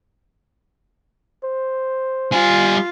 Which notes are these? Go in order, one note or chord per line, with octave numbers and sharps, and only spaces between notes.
C5
G3 F4 G#5